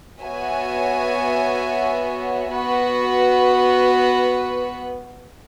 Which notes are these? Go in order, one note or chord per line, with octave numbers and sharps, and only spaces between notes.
B3 F#4 C#5 E5 G#5
B3 F#4 B4